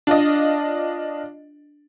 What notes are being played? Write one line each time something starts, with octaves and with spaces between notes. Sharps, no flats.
D4 F4 D5 D#5